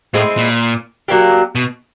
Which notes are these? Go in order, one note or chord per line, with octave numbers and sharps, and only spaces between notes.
A2 G#3 C4 E4 G#4
A#2
F#3 A#3 D4 G4
B2